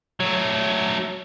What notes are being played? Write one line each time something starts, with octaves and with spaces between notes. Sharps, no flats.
F#3 A3